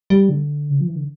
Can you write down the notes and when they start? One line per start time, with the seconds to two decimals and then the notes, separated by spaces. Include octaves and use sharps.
0.10 G3
0.29 D3
0.70 C#3
0.80 F3
0.88 E3
0.95 D3